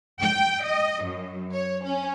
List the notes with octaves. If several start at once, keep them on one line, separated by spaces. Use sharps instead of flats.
G5
D#5
F#2
C#5
C#4